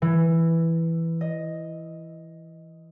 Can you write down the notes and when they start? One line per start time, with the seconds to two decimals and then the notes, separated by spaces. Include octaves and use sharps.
0.02 E3
1.21 D#5